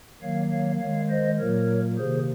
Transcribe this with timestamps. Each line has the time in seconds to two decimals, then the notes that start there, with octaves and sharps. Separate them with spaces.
0.22 D#3 F#3 A#3 C#5 F5
0.51 C#5 F5
0.81 D#3 G#3 C#5 F5
1.10 C5 D#5
1.39 A#2 F#3 A#3 A#4 C#5
1.98 C3 D#3 A#3 G#4 C5